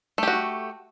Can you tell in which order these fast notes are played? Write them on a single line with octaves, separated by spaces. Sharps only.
A3 G4 F#4